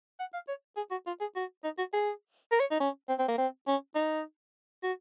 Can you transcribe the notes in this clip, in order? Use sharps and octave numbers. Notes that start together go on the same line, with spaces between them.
F#5
F5
C#5
G#4
F#4
F4
G#4
F#4
D#4
F#4
G#4
A#4
C#5
D#4
C#4
C4
C4
A#3
C4
C#4
D#4
F#4